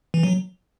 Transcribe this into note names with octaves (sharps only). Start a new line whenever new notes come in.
E3
F#3